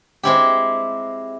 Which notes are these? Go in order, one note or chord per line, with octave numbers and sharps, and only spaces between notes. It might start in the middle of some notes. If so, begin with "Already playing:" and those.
G#3 C4 E4 G4